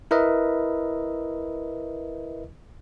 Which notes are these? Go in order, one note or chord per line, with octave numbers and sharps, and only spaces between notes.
E4 A#4 B4 D#5 E5